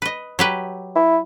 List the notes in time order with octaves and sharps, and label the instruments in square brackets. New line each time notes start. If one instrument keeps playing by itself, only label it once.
[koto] B4 D#5
F#3 G4 B4
[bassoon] E4